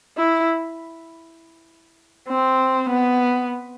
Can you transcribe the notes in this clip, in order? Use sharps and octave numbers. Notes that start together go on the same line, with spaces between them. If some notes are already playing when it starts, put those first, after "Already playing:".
E4
C4
B3